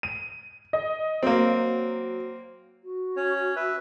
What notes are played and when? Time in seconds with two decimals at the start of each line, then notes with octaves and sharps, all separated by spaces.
0.03 D#7
0.73 D#5
1.23 F#3 A#3 C4
2.84 F#4
3.17 C#4 C#5
3.56 B4 E5